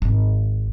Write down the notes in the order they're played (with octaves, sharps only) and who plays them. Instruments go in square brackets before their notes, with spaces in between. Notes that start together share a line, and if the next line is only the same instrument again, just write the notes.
[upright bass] G#1